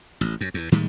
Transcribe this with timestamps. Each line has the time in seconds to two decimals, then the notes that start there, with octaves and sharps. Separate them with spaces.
0.21 A1
0.41 F#2
0.54 E2
0.72 A2 D#3 G3 G#3